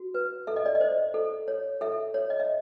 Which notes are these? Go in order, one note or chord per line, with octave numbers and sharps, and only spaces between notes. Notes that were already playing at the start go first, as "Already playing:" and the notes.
Already playing: F#4
B4
A4 E5
D#5
D5
D#5
C5
A4
C#5
A4 E5
C#5
D#5
E5